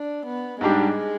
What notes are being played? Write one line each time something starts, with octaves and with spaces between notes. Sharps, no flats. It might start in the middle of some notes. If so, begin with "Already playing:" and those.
Already playing: D4
B3
G#2 G3 G#3 D4 G4